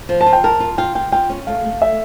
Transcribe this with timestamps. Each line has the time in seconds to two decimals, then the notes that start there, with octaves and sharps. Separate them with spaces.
0.09 F3
0.21 A5
0.26 F4
0.33 G5
0.44 A#4 A5
0.60 F4
0.78 F4 G5
0.95 F4 G5
1.12 F4 G5
1.30 C#4
1.47 A3 F5
1.65 A3
1.82 E5